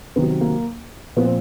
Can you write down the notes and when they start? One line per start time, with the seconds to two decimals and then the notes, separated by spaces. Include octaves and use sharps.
0.16 C3 D#3 F#3 B3
0.41 A#3
1.16 A#2 F3 B3
1.25 C4